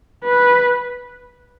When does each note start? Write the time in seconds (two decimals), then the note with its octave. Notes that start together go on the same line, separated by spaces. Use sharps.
0.24 B4